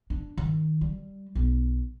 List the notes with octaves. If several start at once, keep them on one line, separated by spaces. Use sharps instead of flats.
D4
D#3
G3
B1